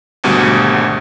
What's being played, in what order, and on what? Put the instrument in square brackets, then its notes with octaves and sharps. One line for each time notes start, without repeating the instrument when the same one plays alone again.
[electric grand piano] G#1 D2 B2 G3